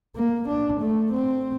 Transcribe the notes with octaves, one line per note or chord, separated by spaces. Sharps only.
A#3
D4
A3
C4